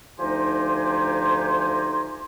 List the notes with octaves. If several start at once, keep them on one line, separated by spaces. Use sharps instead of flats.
D2 F3 D#4 G4 G#5 C6